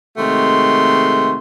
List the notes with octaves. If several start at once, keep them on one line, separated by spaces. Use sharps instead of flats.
C3 D#3 G#3 A3 F#4 C6